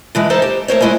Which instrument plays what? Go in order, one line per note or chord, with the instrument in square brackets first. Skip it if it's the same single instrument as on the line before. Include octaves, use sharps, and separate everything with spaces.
[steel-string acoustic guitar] D3 E3 G#3
D#4 E4 A4 C5
G4
A3 A#4 C5 C#5
G#3 A3 E4 D#5 G#5